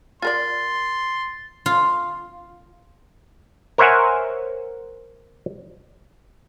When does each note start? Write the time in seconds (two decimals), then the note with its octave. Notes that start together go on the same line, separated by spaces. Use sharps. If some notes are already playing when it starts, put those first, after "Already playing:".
0.22 F4 A#4 D5 C6 A6
1.66 F4
3.78 A#4 C5 C#5 E5 F#5 G#5